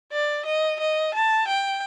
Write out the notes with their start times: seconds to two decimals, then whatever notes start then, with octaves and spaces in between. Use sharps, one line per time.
0.12 D5
0.45 D#5
0.79 D#5
1.14 A5
1.47 G5